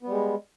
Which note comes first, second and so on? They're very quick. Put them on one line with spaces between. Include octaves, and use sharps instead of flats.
B3 G3 G#3